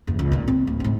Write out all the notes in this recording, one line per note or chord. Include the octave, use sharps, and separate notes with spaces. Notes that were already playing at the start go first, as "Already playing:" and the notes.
F#1 E2
C#2
A#2 D#3
C4
D1
G#2 C4